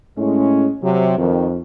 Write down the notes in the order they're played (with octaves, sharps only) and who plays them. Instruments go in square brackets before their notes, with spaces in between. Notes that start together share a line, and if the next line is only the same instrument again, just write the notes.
[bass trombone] A2 [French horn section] G#3 C#4
[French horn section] C3 [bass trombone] F#3
[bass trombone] F2 [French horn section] D#3